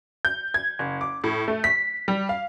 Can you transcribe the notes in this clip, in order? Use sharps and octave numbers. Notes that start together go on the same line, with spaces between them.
G6
G#6
F#1
D6
A2
A3
B6
G3
F5